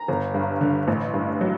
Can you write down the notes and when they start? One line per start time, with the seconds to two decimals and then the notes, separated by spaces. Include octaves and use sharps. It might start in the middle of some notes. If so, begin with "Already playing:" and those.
Already playing: A#5
0.08 G1
0.34 G2
0.61 D3
0.88 A1
1.14 G2
1.41 F#3